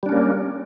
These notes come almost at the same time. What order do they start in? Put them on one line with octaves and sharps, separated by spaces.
G3 D4 C#4 A#3